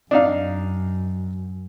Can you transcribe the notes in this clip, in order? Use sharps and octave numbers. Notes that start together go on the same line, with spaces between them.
F#2 D4 D#4 F5